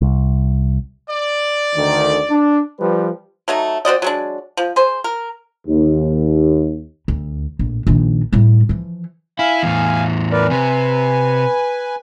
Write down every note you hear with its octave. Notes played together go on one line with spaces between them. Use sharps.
C2
D5
D2 D3 D#3
D4
F3 G3 B4
F#3 A3 D#4
C4 F#4 D5 D#5
F#3 G#3 D4
F3
G#4 C5
A#4
D#2
D2
A#1 A2
A#1 D#3
A2 G3
E3 F3
E4 F5 G#5
E2 A2
A#4 B4 D5
C3 B4 G#5